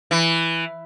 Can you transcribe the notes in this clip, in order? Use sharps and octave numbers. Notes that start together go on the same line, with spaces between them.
E3